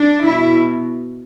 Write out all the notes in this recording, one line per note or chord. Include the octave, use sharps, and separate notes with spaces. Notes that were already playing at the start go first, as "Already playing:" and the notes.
Already playing: D4
B2 E4